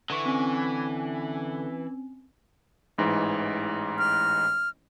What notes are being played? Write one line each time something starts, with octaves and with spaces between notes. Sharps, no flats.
D3 E3 C#6
C4 C#4
A1 G#2 E3
F6